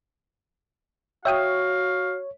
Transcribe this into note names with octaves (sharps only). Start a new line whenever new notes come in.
F#4 C#5 E5 F5 G5 D#6